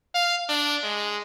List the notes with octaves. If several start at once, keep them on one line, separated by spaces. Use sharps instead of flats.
F5
D4
G#3